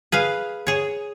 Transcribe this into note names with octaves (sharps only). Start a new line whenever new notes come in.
G#4 B4 F5
G#4 C#5